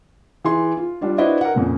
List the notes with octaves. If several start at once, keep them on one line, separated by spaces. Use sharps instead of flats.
E3 G#4 C6
F4
G3 D4 F4
D4 E4 F#4 B4 C5 D#5
A#4 F#5
F2 A#2 C#3